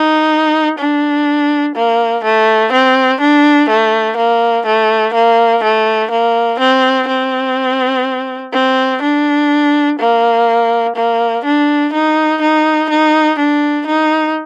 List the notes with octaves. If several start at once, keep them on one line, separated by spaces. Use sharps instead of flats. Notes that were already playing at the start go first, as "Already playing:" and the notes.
Already playing: D#4
D4
A#3
A3
C4
D4
A3
A#3
A3
A#3
A3
A#3
C4
C4
C4
D4
A#3
A#3
D4
D#4
D#4
D#4
D4
D#4